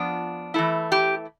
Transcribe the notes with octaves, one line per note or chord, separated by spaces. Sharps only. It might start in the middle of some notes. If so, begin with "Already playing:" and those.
Already playing: F3 B3 D4 F4
E3 A3 E4
G4